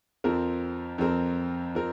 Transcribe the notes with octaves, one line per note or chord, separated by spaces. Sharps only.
F2 F3 C4 A#4
F2 F3 C4 A#4
F3 C4 A#4